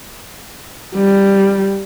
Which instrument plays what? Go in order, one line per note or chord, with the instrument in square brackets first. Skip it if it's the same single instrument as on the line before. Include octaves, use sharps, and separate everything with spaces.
[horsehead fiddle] G3